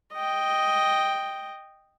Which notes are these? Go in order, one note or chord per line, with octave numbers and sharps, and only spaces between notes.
D#5 G5